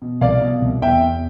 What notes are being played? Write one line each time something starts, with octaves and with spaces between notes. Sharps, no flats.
B2
C2 D5 F5
B2
C2
E2 E5 G5
E2